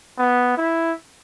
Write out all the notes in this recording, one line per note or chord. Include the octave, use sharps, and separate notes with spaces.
B3
E4